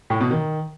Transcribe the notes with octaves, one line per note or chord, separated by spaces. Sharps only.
A2
B2
D#3